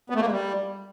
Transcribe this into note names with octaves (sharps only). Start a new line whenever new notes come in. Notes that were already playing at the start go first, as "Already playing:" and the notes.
B3
A3
A#3
G#3
G3